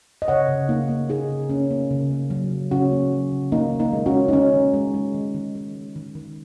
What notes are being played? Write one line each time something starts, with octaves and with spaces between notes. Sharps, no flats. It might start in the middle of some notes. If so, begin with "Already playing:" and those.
D#5
C#3 C#5 F#5
C#3
A#3 D#4
A#3
C#3 D#4 G#4
C#3
A#3 C#4
A#3
C#3
A#3
F#3
C#3
C#3 C#4 F#4
A#3
F#3
C#3
D#3 A#3 D#4
D#3
A#3 D#4
G#3
C#4 F#4
G#3
D#4
D#3 C#4
D#3
G#3
G#3
D#3
D#3
G#3
G#3
D#3
D#3